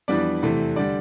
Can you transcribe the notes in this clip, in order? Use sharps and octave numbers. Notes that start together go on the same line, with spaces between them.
F2 E3 G3 B3 D4 D5
E2 C3 E3 A3
D3 G3 D5